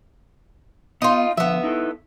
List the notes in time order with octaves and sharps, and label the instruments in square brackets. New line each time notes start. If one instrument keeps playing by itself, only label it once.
[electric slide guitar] B3 [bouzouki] D#4 F4
[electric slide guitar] D3 F3 [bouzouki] B3 E5
[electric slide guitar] D#4 E4 A4